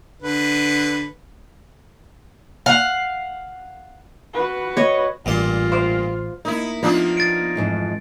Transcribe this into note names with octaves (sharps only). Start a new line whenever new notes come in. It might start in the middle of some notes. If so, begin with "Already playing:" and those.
D3 B4
F5 F#5
F#4 B4
C#5 D#5
A1 G2 A#2 F4 C6
C5 F5 D6
A#3 D#4 E4
F3 A#3 B3 D4 D#4 F4
A6 D7
F2 G#2 E3